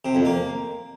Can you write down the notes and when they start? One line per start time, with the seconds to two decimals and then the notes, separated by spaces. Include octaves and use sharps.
0.05 C3
0.15 F2
0.25 A#3